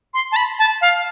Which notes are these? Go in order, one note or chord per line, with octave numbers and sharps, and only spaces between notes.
C6
A5
B5
A5
F5